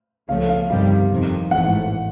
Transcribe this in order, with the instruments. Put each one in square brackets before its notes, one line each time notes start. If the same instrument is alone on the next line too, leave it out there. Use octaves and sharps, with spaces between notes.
[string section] C#2 C#3 F3 A3 [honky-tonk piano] F5
[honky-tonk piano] F5
[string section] G1 F2 C3 D#3 G3 [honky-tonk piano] F5
[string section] F2 C3 D#3
[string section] A1 G#2 E3 A3 [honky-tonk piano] F#5